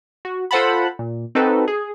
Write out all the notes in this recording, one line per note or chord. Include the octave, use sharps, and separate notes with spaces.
F#4
F4 A4 C5 F#5 A5 B5
A#2
C4 D#4 F#4 A4 B4
G#4